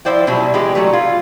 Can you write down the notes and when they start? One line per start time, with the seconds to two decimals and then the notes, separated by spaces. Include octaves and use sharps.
0.05 F3 E4 C5 D5 G5
0.27 B2 F#3 G3 E4
0.54 E3 G#3 G4
0.75 F#3 G3 A3
0.93 F4